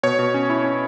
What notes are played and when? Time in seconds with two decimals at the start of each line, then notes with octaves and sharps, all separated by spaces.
0.03 B2 C#5
0.19 B2
0.34 C#4
0.50 E4
0.64 C#4